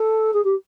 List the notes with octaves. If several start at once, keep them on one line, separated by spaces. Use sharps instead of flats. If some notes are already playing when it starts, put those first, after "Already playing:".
Already playing: A4
G#4
G4